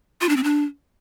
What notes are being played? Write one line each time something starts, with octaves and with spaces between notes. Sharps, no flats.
F4
D4
C4
D4